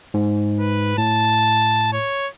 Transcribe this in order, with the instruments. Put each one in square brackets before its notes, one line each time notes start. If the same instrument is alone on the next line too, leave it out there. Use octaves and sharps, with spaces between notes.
[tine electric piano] G#2
[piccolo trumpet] B4
[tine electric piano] A2 [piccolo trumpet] A5
[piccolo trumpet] C#5